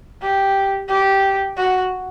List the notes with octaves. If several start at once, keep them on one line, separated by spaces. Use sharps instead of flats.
G4
G4
F#4